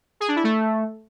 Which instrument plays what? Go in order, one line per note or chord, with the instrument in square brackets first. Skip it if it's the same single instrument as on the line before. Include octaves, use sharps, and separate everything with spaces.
[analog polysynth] G#4
D4
E4
A3